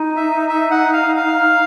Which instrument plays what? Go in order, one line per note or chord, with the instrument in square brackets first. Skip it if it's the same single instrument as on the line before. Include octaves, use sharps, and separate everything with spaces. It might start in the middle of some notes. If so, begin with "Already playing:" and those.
Already playing: [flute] D#4
[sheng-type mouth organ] E5
E5
F#5
F5
F5